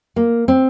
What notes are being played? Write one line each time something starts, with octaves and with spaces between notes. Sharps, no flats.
A#3
C4